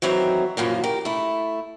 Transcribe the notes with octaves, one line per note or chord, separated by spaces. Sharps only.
D#3 E3 F#3 C4 E5 A#5
F#2 A#2 E3 F3
G4 A#4
A3 E4